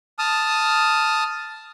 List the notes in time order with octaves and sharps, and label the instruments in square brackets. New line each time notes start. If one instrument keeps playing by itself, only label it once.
[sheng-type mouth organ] A5 D#6 F6